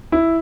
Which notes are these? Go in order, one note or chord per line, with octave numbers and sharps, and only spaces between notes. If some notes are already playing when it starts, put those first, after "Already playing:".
E4